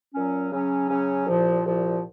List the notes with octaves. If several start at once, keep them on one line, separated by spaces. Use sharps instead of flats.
A#2 F#3 C#4
C#3 F#3 C#4
C#3 F#3 C#4
C2 A#2 F3
C2 A#2 F3